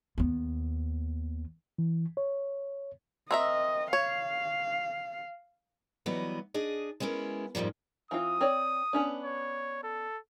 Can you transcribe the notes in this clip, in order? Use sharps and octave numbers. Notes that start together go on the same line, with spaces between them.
D#2 B3
E3
C#5
C4 A#4 D#5 E5
C#5 F5
E3 F#3 G3 B3 D#5
D4 G#4 D#5
G#3 B3 C#4 E4 A#4
F2 G#2 F3 G3 A#3
E3 C4 F4 D#6
C4 C#5 D5
B3 C#4 D4
C#5
A4